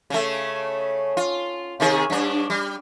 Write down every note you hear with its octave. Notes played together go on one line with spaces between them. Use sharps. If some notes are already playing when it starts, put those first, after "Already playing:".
C#3 A3
F4
C3 D#3 G#4
G2 D4
G3